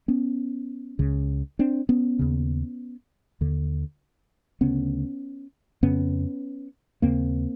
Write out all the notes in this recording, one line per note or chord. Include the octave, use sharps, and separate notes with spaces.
B3 C#4
C#2 C#3
C4 D4
B3 C#4
D#2 C#3
D#2 D3
D2 C#3 B3 C#4
F2 C#3 B3 C#4
D#2 C#3 A#3 C4